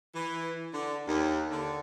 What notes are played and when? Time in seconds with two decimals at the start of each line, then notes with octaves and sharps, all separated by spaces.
0.15 E3
0.74 D3
1.08 D#2
1.51 D3